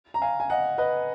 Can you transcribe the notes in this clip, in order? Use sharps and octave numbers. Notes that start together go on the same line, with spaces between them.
A#5
F5 G#5
G#5
D#5 F#5
B4 D#5